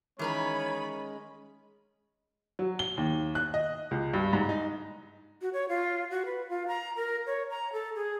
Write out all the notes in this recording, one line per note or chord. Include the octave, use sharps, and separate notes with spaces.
D#3 E3 G#3 C#4 A#4 C#5 A#5 B5
F#3
G7
D#2
F#6
D#5
C#2
G2
G#2
D#4
F#4
C#5
F4
F#4
B4
F4
A#5
A#4
C#5
A#5
A4
G#4